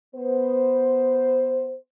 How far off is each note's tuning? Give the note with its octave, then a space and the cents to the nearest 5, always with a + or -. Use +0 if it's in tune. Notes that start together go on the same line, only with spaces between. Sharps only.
B3 +0 C5 -5